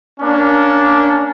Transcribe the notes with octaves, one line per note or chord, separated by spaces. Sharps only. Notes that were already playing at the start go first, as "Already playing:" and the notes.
A#3 C#4 D4